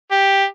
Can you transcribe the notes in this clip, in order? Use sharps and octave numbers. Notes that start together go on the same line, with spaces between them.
G4